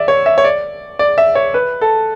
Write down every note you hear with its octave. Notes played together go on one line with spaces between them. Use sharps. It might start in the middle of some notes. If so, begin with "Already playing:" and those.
Already playing: D5 E5
C#5
E5
C#5
D5
D5
E5
C#5
B4
A4